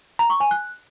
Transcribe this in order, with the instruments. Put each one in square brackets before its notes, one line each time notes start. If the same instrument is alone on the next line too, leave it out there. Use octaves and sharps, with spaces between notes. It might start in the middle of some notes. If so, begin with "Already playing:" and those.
[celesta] A#5
C#6
G#5
F#6